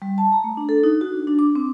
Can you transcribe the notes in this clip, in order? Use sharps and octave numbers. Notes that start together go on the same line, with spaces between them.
G3
A5
A#5
A3
D4
A4
D#4
F#4
D4
D4
D6
C4